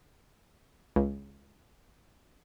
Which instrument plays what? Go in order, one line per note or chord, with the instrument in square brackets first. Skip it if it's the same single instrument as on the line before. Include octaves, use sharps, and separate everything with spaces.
[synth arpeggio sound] C#2